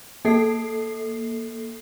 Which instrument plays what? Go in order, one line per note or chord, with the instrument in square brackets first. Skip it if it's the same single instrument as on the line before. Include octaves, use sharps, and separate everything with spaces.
[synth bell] A#3 A4 C7